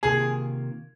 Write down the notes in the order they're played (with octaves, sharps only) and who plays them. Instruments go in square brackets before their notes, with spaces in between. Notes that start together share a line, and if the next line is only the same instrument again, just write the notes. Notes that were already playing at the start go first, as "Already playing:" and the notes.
[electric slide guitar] C3 D#3 A#3 F4 [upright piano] G#4